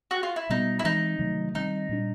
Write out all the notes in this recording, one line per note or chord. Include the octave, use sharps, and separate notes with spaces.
F#4
F4
E4
B2 G3 B3 D#4
E4
E3 G#3 C4 D#4
C3 D#3 F#3 A3
D#3 G3 C4 D#4
A#2 G3 A#3 D4